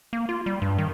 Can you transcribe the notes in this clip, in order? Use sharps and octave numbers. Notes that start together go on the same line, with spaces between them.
A#3
F4
G3
G2
D#3